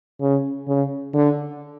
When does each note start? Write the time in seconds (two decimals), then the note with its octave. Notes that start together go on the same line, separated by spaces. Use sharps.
0.21 C#3
0.68 C#3
1.14 D3